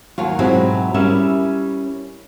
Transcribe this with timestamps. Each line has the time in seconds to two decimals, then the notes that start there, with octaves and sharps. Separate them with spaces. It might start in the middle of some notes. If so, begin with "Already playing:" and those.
0.18 D#2 F#3 F4
0.39 G#2 B2 F#3 G#3 C4 E4
0.94 G3 C#4 E4 A#4 E5